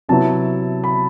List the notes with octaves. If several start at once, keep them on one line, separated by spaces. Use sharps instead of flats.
C3 F#3 B3 E4 A5
B5